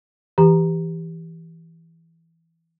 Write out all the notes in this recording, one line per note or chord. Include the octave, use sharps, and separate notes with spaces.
E3 G4 A#5